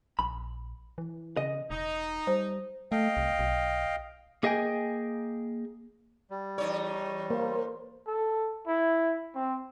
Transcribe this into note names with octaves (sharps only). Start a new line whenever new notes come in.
A#1 B5
E3
C#3 D#5
E1 D#4
G3 C5
A3 D#5 F5 G5
C2
B1
A#3 G#4 D#5 E5 G5 G#5
G3
E2 D#4 C#5 D5
A#3 A#4 C5
A4
E4
C4